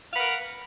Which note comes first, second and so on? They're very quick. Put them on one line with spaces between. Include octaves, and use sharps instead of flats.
F5 F#5 B4 A#4